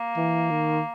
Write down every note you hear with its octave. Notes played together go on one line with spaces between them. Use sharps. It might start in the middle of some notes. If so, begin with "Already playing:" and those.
Already playing: A#3
E3
D#3